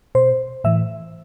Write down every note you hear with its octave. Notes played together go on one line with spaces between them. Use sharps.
B2 C5
A2 E3 E5